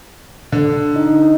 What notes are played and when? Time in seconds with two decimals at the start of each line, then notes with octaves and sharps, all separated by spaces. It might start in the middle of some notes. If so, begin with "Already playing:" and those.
0.52 D3
0.96 D#4